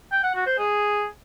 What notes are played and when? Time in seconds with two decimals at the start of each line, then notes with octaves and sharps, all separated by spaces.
0.12 G5
0.23 F#5
0.35 F#4
0.47 C5
0.58 G#4